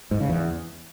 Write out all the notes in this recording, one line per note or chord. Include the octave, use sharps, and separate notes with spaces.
G#2
C#3
E2